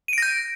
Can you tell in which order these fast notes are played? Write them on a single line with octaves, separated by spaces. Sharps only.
D#7 D7 A#6 G6